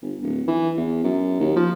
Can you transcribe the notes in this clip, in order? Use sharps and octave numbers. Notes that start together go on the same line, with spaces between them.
G1
D1
E3
E2
F#2
D#2
F3